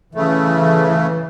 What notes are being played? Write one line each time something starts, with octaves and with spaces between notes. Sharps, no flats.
C#3 E3 A3